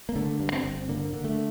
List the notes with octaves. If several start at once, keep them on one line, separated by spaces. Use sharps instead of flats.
A#3
D3 A3
G2
C4
G1
D3 A#3
D3
A3